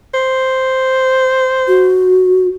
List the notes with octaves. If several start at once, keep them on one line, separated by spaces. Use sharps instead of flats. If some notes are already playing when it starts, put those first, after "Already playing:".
C5
F#4